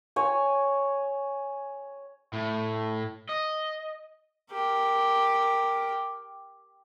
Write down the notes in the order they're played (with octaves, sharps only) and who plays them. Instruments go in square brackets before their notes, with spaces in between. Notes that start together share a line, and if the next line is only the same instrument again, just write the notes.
[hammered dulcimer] C#5 G#5
[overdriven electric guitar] A2
D#5
[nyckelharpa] G4 A#4